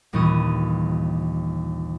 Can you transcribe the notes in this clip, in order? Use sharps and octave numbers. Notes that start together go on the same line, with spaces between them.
G1 D#2 A#2 E3 C#6 D#6